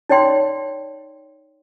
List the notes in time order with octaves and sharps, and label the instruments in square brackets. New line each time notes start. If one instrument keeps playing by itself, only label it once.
[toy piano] D#4 C#5 D5 G5 C6